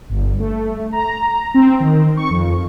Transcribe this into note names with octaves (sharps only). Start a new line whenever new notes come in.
G1
A3
A#5
C4
D#3
C#6
F2